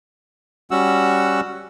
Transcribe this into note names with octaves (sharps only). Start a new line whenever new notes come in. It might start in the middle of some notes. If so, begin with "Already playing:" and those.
G3 C#4 F#4 F#5 E6